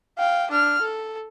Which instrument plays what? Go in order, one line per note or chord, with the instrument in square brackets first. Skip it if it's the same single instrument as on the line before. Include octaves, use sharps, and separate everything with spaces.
[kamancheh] F5 G5
D4 F6
A4